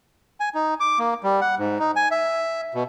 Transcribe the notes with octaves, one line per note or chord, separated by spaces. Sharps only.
G#5
D#4
D6
A#3
G3
F#5
G#2
D#4
G#5
E5
B2